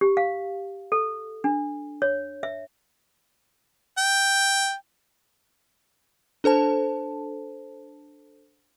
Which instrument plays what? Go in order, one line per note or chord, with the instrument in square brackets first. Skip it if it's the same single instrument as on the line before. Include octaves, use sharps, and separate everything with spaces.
[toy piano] G4
F5
A4
D4
C#5
E5
[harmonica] G5
[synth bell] D4 A4 C5 A5